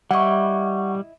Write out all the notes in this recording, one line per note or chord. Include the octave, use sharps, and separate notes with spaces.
G3 E4 D#5 F#5 C#6